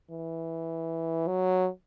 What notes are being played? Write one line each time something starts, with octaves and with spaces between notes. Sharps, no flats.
E3
F#3